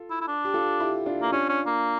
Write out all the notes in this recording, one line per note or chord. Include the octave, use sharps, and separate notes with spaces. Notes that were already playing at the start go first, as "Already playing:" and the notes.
Already playing: F4 A4
E4
E4
D4
G4
F4 A4
E4 G4
D4 F4
A#3
C#4 D4 F4
C#4
A#3